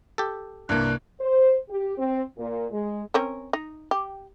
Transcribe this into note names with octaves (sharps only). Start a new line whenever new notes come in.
G4 A4
C2 G2 A#3 D4 F#6
C5
G4
C4
A#2
G#3
C4 C#4 A#4
D#4
G4